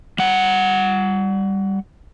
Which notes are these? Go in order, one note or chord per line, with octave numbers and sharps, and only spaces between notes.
G3 F#5